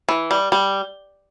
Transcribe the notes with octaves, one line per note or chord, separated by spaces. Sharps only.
E3
G3
G3